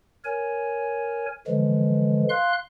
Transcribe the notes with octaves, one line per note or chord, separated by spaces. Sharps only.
A#4 C#5 G#5
D3 E3 F3 G#3
F5 C6 F#6